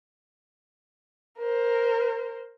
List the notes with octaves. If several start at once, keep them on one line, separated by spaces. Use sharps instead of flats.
A#4 C5